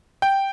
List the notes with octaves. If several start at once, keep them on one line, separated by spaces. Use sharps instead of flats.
G5